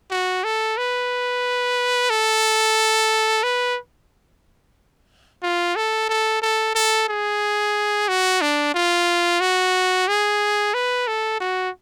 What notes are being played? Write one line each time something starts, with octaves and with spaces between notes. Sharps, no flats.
F#4
A4
B4
A4
B4
F4
A4
A4
A4
A4
G#4
F#4
D4
F4
F#4
G#4
B4
A4
F#4